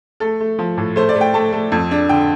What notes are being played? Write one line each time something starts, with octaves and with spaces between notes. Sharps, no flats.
A3 A4
A3
F3
A2
A3 C5
D5
A3
G5
A3 A5
A3
F2
D4
D3 G5